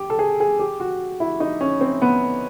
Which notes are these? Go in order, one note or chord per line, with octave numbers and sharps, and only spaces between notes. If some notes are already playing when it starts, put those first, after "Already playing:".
Already playing: G4
A4
G#4
G#4
G4
F#4
E4
D#4
C#4
C4
B3